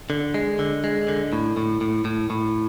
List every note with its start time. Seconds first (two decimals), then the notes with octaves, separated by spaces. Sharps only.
0.10 D3
0.34 G#3
0.59 D3
0.84 G#3
1.08 D3
1.33 A2
1.57 A2
1.81 A2
2.05 A2
2.30 A2